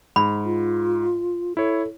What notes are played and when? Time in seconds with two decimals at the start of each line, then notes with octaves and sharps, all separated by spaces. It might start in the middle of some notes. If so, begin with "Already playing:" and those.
0.16 G#2 B5
0.45 F4
1.57 E4 A4 C#5